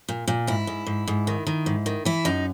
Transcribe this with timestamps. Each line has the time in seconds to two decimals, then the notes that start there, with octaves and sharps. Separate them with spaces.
0.09 A#2
0.27 A#2
0.47 G#2 E4
0.67 G#2
0.87 G#2
1.07 G#2
1.27 D#3
1.47 D#3
1.66 G#2
1.86 D#3
2.05 E3 E4
2.25 F#2 D#4